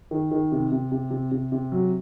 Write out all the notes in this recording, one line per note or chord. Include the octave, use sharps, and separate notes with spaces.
D#3
D#3
C3
C3
C3
C3
C3
C3
F#3